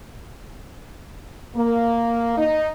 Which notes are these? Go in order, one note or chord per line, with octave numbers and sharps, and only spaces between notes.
A#3
D#4